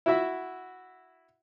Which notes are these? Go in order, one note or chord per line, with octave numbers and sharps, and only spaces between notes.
E4 F#4 E5